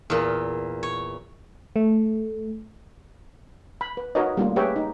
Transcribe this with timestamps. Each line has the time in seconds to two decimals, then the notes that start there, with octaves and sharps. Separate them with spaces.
0.10 E2 A#2
0.83 C#5
1.76 A3
3.81 B5
3.97 B4
4.15 D#4 F#4 A#4 B4 C#5 D#5
4.37 G3 A3 A#3 C#4 F4
4.56 G4 G#4 B4 C#5 E5 G5
4.76 D#4